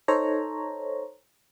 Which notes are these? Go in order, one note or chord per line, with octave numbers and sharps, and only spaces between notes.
D#4 A4 C5 C#5 A#5